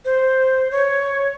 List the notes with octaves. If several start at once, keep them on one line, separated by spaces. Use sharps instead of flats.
C5
C#5